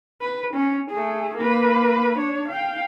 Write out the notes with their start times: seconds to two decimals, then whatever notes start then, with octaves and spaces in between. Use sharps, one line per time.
0.21 B4
0.54 C#4
0.91 A3 G#4
1.37 A#3 B4
2.18 D4 C#5
2.49 F5 G5